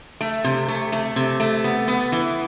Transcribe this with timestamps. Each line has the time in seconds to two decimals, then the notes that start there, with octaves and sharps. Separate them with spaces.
0.21 A3
0.44 C3
0.68 A3
0.92 A3
1.16 C3
1.40 A3
1.64 B3
1.88 B3
2.12 E3